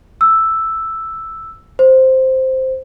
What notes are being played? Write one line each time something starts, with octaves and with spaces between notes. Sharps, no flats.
E6
C5